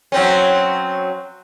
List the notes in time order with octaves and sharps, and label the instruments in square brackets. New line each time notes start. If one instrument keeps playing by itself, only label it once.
[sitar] F#3 C4 C#4